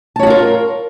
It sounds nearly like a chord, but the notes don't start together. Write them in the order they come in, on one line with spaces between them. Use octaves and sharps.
A5 C#5 F#4 F4 A#4